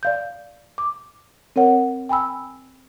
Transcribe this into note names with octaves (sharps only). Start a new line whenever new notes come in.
D5 F5 G6
D6
C4 A#4 C#5 F#5
G5 G#5 B5 E6